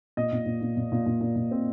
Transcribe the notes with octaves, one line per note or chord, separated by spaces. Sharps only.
A#2 D#5
A#2
A#2
A#2
A#2
A#2
A#2
A#2
A#2
C4